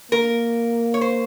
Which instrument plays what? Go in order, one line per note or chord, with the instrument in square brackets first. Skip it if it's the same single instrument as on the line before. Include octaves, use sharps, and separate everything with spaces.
[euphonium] A#3 [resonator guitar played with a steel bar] A#4
[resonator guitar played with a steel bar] C#5
C5